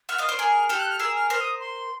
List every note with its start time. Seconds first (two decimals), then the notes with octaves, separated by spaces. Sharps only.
0.09 E5 F#5 F6
0.18 D#5 F5
0.23 F6
0.29 C5 D5
0.39 G#4 A#4
0.69 G4 A4 F6
0.79 F#6
0.89 F6
0.99 G#4 A#4 E6
1.15 F6
1.30 A#4 C5 F6
1.41 D#6
1.60 C6